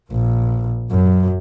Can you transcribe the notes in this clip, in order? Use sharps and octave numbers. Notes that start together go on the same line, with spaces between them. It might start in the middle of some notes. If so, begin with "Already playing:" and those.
A#1
F#2